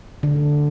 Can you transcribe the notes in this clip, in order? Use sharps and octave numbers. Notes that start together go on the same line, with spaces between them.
D3